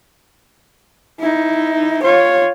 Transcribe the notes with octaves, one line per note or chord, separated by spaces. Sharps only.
D#4 E4
F4 C#5